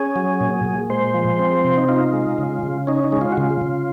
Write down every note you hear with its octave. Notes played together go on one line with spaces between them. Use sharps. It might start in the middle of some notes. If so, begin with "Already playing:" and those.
Already playing: C#4 G#4
F#3
A#2
A#2
G#3 C5
F3
C4
C3
D#4
D#4 F4
G#3
C#3
C#3
C#4 D#4
D#4
G#3
F4
F#4
C#3 F4
C#3